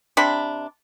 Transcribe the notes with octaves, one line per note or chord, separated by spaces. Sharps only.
C3 C4 D4 B5